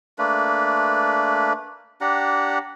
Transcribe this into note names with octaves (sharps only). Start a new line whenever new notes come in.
A3 A#3 D4 B4
D4 G4 F#5 A#5